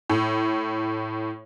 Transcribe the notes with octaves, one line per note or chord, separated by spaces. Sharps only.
A2